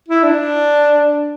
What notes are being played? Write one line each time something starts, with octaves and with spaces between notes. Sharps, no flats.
E4
D4